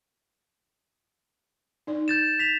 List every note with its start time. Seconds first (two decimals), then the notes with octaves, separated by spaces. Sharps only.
1.87 D#4 D5
2.08 G6 A6 E7
2.39 B6 F7